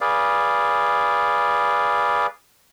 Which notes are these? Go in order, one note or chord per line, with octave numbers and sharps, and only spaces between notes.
G#4 B4 D5 F5